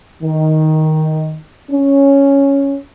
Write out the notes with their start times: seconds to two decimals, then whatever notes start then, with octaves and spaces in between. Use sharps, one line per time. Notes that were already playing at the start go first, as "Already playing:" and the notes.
0.23 D#3
1.71 C#4